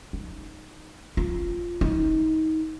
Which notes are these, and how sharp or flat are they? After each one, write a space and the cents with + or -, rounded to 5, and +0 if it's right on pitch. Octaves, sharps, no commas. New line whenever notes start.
D#4 +0
F4 -5
D#4 +25